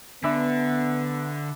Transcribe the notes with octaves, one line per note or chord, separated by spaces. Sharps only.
D3 B3 D4 E5 B5